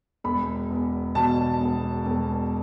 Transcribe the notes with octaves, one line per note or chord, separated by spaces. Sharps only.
E1 B5
E2
B2 A5
E1
E1